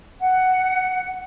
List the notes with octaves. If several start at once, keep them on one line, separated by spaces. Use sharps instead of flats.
F#5